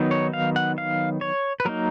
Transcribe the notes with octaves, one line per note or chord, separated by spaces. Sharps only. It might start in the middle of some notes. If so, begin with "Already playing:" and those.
Already playing: D#3 F#3 B3 D#4
C#5
F5
F#5
F5
C#5
B4
F#3 A#3 D#4 A#4